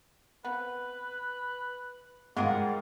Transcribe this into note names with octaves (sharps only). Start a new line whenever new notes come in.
B3 C4 B4
G#2 G3 F4 G#4 A#4 F#5